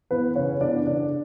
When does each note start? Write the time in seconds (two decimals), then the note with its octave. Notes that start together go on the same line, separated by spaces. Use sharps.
0.11 E3 B3 B4
0.36 C#3 C#4 C#5
0.61 E3 B3 D4 D5
0.87 C#3 D4 D5